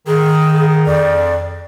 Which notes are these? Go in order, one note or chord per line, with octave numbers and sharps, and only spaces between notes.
D#3 G#4
F2 D5